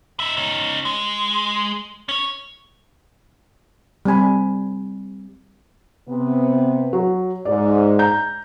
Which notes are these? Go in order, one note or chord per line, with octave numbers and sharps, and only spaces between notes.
D#4 E5
C#4 D#4
G#3
C#4 C#5
G3 C4 G#5 B5
C3 B3
F#3
G#2 D5
A#5 G6